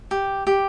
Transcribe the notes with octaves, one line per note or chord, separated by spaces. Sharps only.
G4
G4